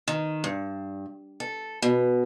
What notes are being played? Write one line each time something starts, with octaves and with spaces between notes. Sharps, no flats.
D#3
G2
A4
B2